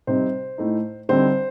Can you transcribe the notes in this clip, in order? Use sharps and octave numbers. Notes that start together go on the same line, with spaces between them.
C3 G3 C4 D#4 C5
A2 A3 D#4
D3 G3 C4 D#4 C5